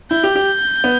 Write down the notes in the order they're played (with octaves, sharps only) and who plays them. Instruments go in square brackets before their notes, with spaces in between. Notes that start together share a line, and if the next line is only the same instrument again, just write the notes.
[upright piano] E4 [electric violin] G6
[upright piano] G4
G4
B3